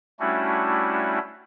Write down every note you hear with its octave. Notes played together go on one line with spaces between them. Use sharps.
G3 A3 C#4 D4 E4 F#4